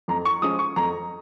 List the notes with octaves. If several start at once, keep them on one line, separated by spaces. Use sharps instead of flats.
F2 A#5
C#6
F3 G#3 C#4 D#6
C#6
F2 A#5